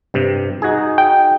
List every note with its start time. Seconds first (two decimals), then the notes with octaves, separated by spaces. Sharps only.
0.14 G2 C3
0.62 D#4 F#4 G#4
0.98 G5